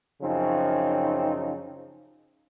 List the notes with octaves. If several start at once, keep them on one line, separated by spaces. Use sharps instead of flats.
F#2 C#3 F3 C4 D#4